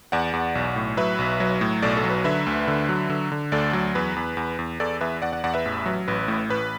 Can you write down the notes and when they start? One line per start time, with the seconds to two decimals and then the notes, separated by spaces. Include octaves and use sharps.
0.12 E2 D5 F#5
0.33 E2
0.55 B1
0.76 A2
0.97 F#3 B4 E5
1.19 B1
1.40 F#3
1.61 A2
1.82 B1 A4 D5
1.97 A4
2.04 F#3
2.10 B4
2.24 D3 B4 E5
2.46 D2
2.68 D3
2.89 F#3
3.10 D3
3.32 D3
3.52 D2 A4 D5
3.73 F#3
3.95 E2 B4
4.16 E2
4.37 E2
4.59 E2
4.80 E2 A4 D5
5.01 E2 B4 E5
5.22 E2 D5 F#5
5.32 D5 F#5
5.44 E2 D5 F#5
5.54 B4 E5
5.65 A1
5.86 F#3
6.08 A1 B4
6.28 A2
6.49 A1 B4